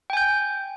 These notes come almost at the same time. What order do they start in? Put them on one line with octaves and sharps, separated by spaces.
G5 G#5 G6